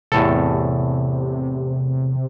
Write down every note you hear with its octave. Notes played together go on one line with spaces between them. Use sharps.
E2 A2 C3 A4